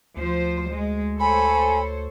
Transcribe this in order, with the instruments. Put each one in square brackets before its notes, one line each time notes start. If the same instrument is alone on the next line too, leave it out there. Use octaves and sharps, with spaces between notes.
[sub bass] D2 [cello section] F3 C5
[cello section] G#3
[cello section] A4 C5 C#5 [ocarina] G#5 [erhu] B5